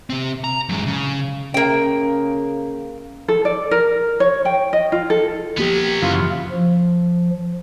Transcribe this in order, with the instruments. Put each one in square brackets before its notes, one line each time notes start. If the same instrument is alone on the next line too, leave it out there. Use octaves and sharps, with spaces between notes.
[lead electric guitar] C3 C4
A#5
F#2 G#3
C#3
[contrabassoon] C#3 [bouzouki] A#3 G5
[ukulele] A4
D5
A#4
C#5
G5
D#5
F4
A4
[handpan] F3 A#3 G4 [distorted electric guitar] F#3 B3
[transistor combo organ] F#2 C#3 E3 [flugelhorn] F4
[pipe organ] F3